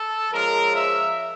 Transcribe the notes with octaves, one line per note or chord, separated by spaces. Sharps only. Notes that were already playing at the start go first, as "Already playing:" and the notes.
Already playing: A4
F3 G#3 C#4 A#4
E5